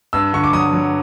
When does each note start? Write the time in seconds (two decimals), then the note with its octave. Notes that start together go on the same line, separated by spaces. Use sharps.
0.13 G2 E6
0.33 D3 C#6
0.44 D6
0.53 F#3 D#6
0.73 F#3